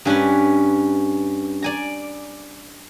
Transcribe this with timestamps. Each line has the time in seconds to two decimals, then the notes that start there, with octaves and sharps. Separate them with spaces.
0.05 G2 C#4 A#4 B4
1.62 D5 G#5 A#5